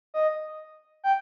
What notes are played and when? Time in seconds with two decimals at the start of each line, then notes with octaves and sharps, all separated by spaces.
0.14 D#5
1.04 G5